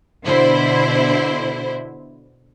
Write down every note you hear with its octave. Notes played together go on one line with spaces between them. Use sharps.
B2 D3 E4 C5